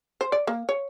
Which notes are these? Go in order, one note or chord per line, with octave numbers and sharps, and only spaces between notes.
C5
D5
A#3
C#5